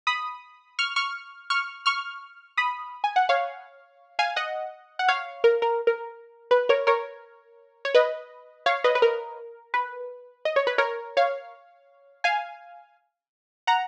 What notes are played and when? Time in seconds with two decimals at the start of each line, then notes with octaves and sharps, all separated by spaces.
0.07 B5 D#6
0.79 C#6 F6
0.96 C#6 F6
1.50 C#6 F6
1.86 C#6 F6
2.57 B5 D#6
3.04 G#5
3.16 F#5
3.29 C#5 F5
4.19 F5 G#5
4.36 D#5 F#5
4.99 F#5
5.08 C#5 F5
5.44 A#4
5.62 A#4
5.87 A#4
6.51 B4
6.69 A#4 C#5
6.87 A#4 C#5
7.85 C#5
7.95 B4 D#5
8.66 C#5 F5
8.84 B4 D#5
8.95 B4
9.02 A#4
9.74 B4
10.45 D#5
10.56 C#5
10.67 B4
10.78 A#4 C#5
11.17 C#5 F5
12.24 F5 G#5
13.67 F#5 A#5